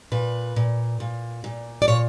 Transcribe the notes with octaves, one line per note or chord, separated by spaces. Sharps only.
A#2 B4
A#2
A#2
A#2
D5
A#2 C#5